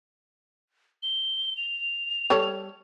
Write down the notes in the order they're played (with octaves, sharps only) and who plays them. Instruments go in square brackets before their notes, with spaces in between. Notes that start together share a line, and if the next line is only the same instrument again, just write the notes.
[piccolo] G7
F7
[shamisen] G3 A4 C#5